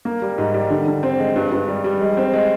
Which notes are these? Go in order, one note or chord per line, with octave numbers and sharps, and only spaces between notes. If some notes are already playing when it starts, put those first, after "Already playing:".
A#3
G3
G#2
G3
D3
D3
C4
G#3
G2
G2
G3
G3
G#3
C4
G#3